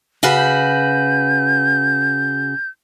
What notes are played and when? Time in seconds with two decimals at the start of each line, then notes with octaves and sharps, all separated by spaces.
0.23 C#3 F#4 B4
0.37 G6